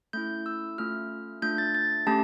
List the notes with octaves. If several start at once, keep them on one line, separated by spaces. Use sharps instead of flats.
A3 C#4 E4 G6
E6
A3 C#4 F4 F6
A3 D4 F4 G6
A6
A6
A3 C#4 G4 A5